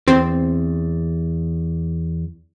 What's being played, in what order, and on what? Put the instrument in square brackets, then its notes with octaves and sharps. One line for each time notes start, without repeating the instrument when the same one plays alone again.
[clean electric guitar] E2 [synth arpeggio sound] C4